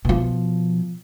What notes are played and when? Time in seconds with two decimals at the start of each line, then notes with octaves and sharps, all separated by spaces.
0.05 B2 F3